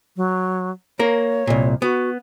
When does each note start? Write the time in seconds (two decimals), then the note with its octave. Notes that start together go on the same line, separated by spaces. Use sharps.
0.17 F#3
0.99 A#3 A#4 C#5
1.47 C2 A#2
1.82 B3 F#4